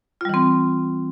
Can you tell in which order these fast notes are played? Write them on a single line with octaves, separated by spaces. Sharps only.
F4 G3 E3 C4